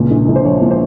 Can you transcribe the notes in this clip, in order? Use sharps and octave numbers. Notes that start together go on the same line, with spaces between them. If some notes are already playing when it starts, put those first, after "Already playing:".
Already playing: C#2 A#2
A#1
A#1
C5
F3 C#5
A#2
C5